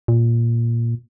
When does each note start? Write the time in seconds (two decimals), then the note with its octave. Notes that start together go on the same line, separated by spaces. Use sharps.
0.08 A#2